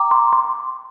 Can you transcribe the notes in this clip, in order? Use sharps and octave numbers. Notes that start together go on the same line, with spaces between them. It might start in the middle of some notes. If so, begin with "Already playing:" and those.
Already playing: G5 A#5 D6
C6
C6